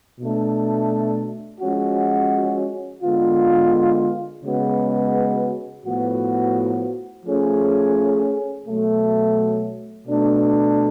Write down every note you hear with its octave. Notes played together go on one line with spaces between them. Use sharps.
B2 A3 D4
F3 G#3 C#4 F#4
D3 G#3 B3 F4
C#3 G#3 B3 F#4 B4
A2 F3 B3 F#4
F3 A3 C#4 G#4
B2 F#3 A3
B2 A3 D4